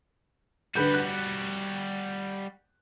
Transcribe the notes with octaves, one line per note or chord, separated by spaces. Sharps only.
D3 G3 F#4 B4 G6
F#6